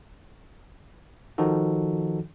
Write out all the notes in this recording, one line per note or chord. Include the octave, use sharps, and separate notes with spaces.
D#3 F3 D#4 F#4 A4